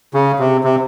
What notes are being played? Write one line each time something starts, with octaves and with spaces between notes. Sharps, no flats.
C#3
C3
C3